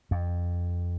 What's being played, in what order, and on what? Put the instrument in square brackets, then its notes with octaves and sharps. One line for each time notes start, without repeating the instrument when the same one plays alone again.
[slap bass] F2